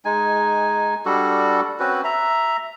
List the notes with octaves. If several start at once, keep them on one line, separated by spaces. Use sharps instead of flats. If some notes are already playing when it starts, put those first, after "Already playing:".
G#3 D#4 G#5
G3 D4 F#4 A4
C4 C#4 F#4 B4
E5 A#5